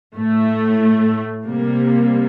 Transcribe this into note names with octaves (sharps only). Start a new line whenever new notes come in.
A2 A3
C3 G3 A#3